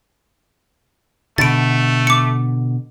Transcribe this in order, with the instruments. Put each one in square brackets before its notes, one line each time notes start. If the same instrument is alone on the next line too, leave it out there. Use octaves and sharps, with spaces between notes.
[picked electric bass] B2 D3 [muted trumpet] A3 [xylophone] A6 D7
[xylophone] D6 C#7